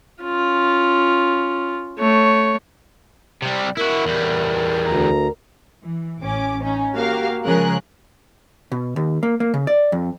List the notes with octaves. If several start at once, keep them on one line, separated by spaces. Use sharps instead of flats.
C#4 F4
A3 C#5
C3 G3
E4 F#4 A#4
E2 G3
D2 A#5
E3
A1 C#4 D6
C#4 D#4
A#3 F#4 G4 A#4 F5
C#3 F3 G#3 G#4 A#4 F#6
B2
D#2
A#3
A#3
C#3
D5
F2